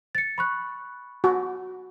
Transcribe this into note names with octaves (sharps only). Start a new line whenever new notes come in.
A6 C#7
B5 C#6 F#6
F#4